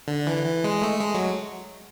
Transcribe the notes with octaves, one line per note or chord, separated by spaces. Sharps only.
D3
E3
E3
G#3
A3
G#3
F#3